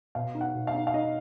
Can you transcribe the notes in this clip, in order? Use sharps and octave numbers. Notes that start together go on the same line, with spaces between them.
B2 F5
D#4
F#5
B2
F5
D#4
F5
D#4 D#5